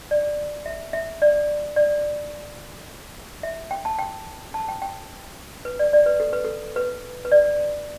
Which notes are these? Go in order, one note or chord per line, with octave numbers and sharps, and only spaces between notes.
D5
E5
E5
D5
D5
E5
G5
A5
G5
A5
G5
G5
B4
D5
D5
B4
A4
B4
A4
B4
B4
D5